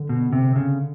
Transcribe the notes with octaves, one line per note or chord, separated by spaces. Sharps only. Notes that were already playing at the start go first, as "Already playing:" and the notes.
Already playing: D3
B2
C3
C#3